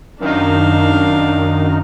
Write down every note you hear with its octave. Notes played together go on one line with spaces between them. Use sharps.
F#2 D#3 D4 D#4 F5